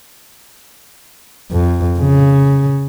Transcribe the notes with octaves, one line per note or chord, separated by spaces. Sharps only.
F2
C#3